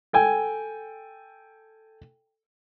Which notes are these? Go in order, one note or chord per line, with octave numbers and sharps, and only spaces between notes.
A4 G5 G#5